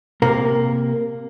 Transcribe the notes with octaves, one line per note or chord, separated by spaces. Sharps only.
C3 A#3 A#4